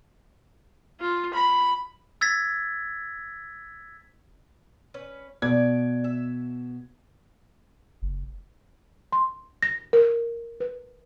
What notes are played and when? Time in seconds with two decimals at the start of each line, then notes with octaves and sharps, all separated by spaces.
1.00 F4
1.34 B5
2.21 E6 G#6 A6 B6
4.94 C#4 B4
5.42 B2 D5 G#6
6.04 E5
8.02 F#1
9.12 C6
9.62 A#6
9.93 A#4
10.60 B4